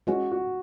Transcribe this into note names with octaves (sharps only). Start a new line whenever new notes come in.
E3 G#3 C#4 F#4
F#4